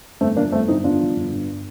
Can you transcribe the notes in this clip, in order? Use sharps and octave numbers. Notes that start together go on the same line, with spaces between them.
G1 A3 C4
F3 A#3 D4
G1 A3 C4
G2 C4 D#4
G1 D4 F4
F3
G1
G2